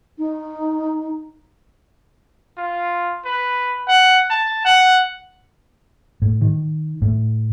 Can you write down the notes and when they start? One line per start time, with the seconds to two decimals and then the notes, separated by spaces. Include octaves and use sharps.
0.19 D#4
2.58 F4
3.25 B4
3.88 F#5
4.30 A5
4.65 F#5
6.22 A2
6.41 D#3
7.02 A2